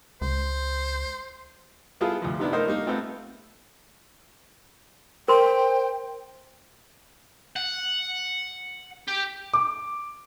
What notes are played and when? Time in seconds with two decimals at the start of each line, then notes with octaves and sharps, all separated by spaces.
0.21 C#2 C5
2.00 G3 B3 E4 F4 G#4 A4
2.22 D2 F3
2.39 C3 D#3 B3 D4 E4
2.53 A3 D#4 A#4 C5 D#5
2.67 G3 A#3 D#4
2.86 A3 B3 C4 F4
5.28 A#4 C5 G5 C6
7.56 F#5
9.08 G4
9.54 D6